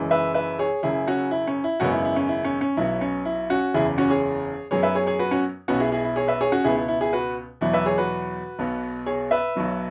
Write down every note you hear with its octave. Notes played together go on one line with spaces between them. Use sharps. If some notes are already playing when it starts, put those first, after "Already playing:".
Already playing: F#1 F#2 E3 G#3
B4 E5
B4 E5
G#4 C#5
F#1 F#2 C#3 E4 G#4
C#4 F#4
E4
C#4
E4
G#1 F#2 C#3 G#3 B3 C#4 F#4
E4
E4
C#4
E4
C#4
C#4
B1 B2 F#3 B3 E4
C#4
E4
C#4 F#4
F#1 E2 C#3 E4 G#4
C#4 F#4
G#4 C#5
F#2 F#3 B3 G#4 C#5
B4 E5
G#4 C#5
G#4 C#5
F#4 B4
C#4 F#4
B1 B2 B3 C#4 F#4
E4 G#4
E4 G#4
E4
G#4 C#5
B4 E5
G#4 C#5
C#4 F#4
C#2 B2 B3 E4 G#4
E4
E4
E4 G#4
F#4 B4
E2 B2 F#3 E4
B4 E5
G#4 C#5
F#4 B4
B1 B2 B3
G#4 C#5
B4 E5
B1 B2 F#3 B3